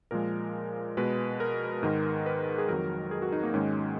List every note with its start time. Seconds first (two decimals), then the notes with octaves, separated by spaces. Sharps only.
0.11 A#2 F3 G#3 A#4
0.97 B2 G#3 B4
1.40 A#4
1.83 G#2 D#3 G#3
2.26 B4
2.58 G#4
2.68 F2 D#3 F#3 A#4
3.11 G#4
3.22 F#4
3.32 D#4
3.43 A#3
3.54 G#2 D#3 G#3 C#4